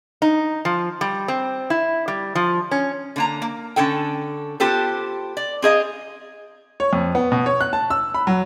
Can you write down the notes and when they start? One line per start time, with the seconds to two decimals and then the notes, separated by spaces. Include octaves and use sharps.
0.22 D#4
0.65 F3
1.01 G3
1.28 C4
1.70 E4
2.08 G3
2.35 F3
2.71 C#4
3.16 D3 A#3 A#5
3.42 A#3
3.76 D3 C#4 A4 G5
4.60 B3 F4 G4 A4 C5
5.37 D5
5.62 C4 G#4 D#5 F5
6.80 C#5
6.93 F2
7.15 B3
7.32 B2
7.46 C#5
7.61 F#6
7.73 A5
7.90 E6
8.14 B5
8.27 F#3